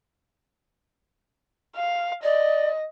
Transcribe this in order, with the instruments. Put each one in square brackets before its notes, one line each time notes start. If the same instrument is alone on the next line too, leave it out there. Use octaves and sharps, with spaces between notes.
[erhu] F5
[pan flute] D5 [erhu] D#5